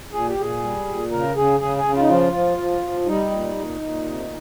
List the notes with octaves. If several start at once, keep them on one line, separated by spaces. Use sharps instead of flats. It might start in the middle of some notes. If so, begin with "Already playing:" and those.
A#2 G#4
G4
A#2 G#4
G3
A#2
C#3 A#4
C#3 G#4
C#3 G#4
G#4
C#3
F4
D#4
F3 F4
F3
F3
F3
G3 D#4
A#2
A#2
A#2
C3